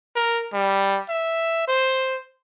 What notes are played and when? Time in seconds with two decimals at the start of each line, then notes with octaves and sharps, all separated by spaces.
0.16 A#4
0.53 G3
1.09 E5
1.67 C5